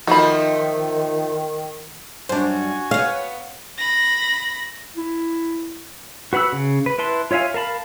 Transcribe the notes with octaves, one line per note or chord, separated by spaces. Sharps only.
D#3 F3 A3 D#4 F#4 B5
F#2 G3 D4 F#4 C5 G#5
B3 C#5 F5
B5 A#6
E4
F#4 B4 F#5 B5 E6
C#3
B4
E4 B4 A5 C6
F4 C#5 E5 F5 G#5
A#4 F5 A5 B5